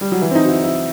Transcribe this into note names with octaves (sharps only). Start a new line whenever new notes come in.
G3
F#3
E3
C4
D#4
F#4
E4
E4